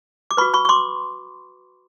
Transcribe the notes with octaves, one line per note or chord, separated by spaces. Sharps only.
D6
F#4 B4 B5 C#6
B5 C#6
C#6
C6 D6